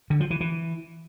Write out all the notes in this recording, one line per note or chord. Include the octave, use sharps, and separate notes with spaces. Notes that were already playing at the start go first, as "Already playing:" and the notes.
D3
F3
E3
E3